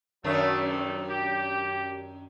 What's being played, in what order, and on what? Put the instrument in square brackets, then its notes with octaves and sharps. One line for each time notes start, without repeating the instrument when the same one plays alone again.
[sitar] F#2 D#3 D4 [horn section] F#3 A3
[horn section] C3 F3 A3
G4